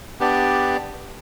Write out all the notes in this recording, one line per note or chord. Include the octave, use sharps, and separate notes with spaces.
B3 D4 G4 D5